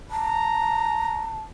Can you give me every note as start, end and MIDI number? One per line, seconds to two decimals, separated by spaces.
0.11 1.41 81
0.11 1.31 82